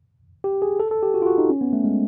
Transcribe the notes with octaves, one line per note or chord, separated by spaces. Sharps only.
G4
G#4
A4
A4
G4
F#4
F4
F#4
D#4
C#4
B3
A3
G#3